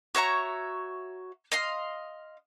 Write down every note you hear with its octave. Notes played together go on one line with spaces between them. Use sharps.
F#4 C#5 E5 A#5
D#5 F5 C6